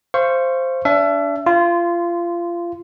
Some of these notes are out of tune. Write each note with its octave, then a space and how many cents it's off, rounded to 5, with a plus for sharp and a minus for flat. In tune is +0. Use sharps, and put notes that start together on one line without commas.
C5 +0 F5 -30 C#6 -5
D4 -30 E5 +30
F4 -25 C6 -10